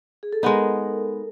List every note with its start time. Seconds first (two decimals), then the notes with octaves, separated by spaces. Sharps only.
0.23 G#4
0.33 A4
0.42 G#3 B3 D#4 A#4